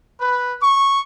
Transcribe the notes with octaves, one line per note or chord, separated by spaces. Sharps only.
B4
C#6